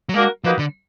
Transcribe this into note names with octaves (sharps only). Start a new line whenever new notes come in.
F#3
G#3 A#3 D4 F#4 A#4
F3 A#3 D#4 F#4 B4
D3